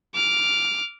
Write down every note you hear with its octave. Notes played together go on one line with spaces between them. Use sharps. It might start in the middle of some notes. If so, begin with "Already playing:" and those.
D6 F6